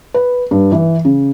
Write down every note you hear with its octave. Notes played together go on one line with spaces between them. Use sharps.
B4
G2
E3
C#3